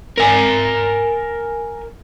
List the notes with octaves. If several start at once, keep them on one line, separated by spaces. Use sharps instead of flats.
A#4 G#5